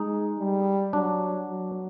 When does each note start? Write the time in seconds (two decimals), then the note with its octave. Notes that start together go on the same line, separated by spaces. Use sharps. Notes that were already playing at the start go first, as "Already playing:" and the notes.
Already playing: G#3 D#4
0.38 G3
0.93 F#3 D4
1.49 F#3